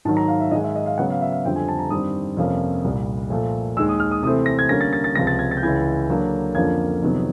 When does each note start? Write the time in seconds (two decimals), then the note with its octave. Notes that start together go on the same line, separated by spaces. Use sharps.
0.05 G#2 D#3 F#3 A5
0.17 A#5
0.28 F5
0.40 E5
0.51 G#2 D#3 G#3 D#5
0.64 E5
0.76 D#5
0.86 F5
0.98 C#3 F#3 B3 F#5
1.10 F5
1.21 E5
1.32 F5
1.45 F2 D3 G3 C4 F4 G5
1.56 G#5
1.68 A5
1.79 A#5
1.90 G2 D#3 G3 C4 D#6
2.37 F2 C3 F3 A#3 C#4
2.85 C2 A#2 G3
3.30 A#2 F3 A3
3.77 D#2 D#3 G#3 E6
3.89 D#6
4.00 F6
4.11 D#6
4.23 C3 E3 A3 C4 D#6
4.46 A#6
4.59 G#6
4.69 D3 G3 A#3 C#4 A#6
4.81 A6
4.93 A6
5.04 A6
5.15 C#2 C3 F3 A#6
5.27 A6
5.39 G#6
5.51 A6
5.57 G6
5.63 C#2 C#3 E3 G#6
6.09 D3 F#3 A#3 D4
6.55 F2 D3 F3 A#3 C#4 G#6
7.02 F2 C3 D#3 F#3 B3